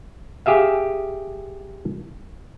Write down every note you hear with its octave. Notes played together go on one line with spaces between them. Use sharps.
G4 G#4 E5 F5